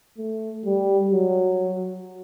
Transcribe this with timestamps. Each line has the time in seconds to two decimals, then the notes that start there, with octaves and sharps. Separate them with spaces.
0.18 A3
0.65 G3
1.12 F#3